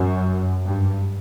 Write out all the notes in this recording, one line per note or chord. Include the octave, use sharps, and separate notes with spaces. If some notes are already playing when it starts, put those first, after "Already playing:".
Already playing: F#2
G2